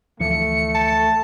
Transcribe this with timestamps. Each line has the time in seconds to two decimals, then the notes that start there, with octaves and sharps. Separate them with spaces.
0.20 D2 E3 F3 A3 C#7
0.75 A5